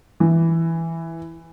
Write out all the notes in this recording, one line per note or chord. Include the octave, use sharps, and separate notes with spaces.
E3